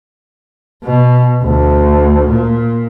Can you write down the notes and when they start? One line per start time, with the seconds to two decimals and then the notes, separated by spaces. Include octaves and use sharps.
0.84 B2
1.42 D2
2.28 A#2